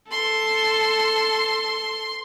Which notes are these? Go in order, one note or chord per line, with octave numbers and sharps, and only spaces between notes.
A4 C6